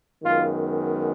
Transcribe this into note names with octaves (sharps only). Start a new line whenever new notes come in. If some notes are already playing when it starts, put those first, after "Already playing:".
F#2 D#3 G#3 B3 F4